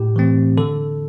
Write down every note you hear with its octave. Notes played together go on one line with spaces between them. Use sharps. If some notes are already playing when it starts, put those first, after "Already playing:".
Already playing: A2 G4
E3 A3 C4
D3 A4